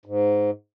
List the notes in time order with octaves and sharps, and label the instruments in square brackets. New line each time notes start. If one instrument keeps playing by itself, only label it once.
[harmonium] G#2